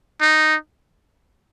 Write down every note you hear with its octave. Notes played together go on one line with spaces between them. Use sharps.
D#4